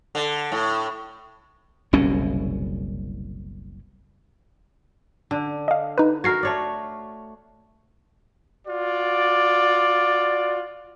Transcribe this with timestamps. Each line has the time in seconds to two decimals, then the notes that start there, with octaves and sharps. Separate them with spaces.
0.15 D3
0.52 A2
1.93 F#1 C2 B2 C#4
5.31 D3
5.68 D#5 F5
5.98 D#4 B4
6.24 F#4 A#4 G#6 C7
6.43 A3 C#5 D5
8.67 F4 F#4 D5